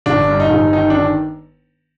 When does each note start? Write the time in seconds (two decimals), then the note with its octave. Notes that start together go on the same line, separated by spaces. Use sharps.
0.06 G1 D4
0.28 G2
0.40 D#4
0.50 G1
0.73 D#3 D#4
0.90 D4
0.95 D#3